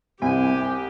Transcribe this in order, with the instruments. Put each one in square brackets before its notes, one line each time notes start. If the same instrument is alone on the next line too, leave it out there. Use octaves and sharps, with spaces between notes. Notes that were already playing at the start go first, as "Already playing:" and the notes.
[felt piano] C2 [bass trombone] C3 [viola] G4 [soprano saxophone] G#5